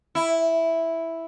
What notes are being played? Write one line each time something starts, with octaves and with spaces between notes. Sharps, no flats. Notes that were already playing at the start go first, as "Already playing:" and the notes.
E4